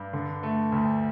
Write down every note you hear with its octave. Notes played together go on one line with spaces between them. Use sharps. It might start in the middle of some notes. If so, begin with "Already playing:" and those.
Already playing: G2
D3
A3
D2